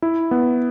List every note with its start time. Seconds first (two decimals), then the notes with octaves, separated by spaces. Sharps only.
0.02 E4
0.31 B3